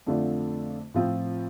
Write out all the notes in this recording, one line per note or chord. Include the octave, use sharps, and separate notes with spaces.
F2 D3 A3 D4 F4
A2 F3 C4 F4